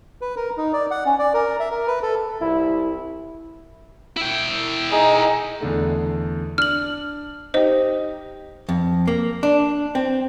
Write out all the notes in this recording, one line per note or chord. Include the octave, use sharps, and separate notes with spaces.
B4
A#4
D#4
D5
F#5
C#4
D5
A#4
E5
A#4
B4
A4
C2 E4
E4 G5
D#4 G#4
E2 D3 A3
D4 F6 F#7
D#4 G4 C5 D#5
F2
A#3
D4
C4